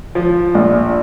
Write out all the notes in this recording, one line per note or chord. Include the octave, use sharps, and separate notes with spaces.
F3
A#1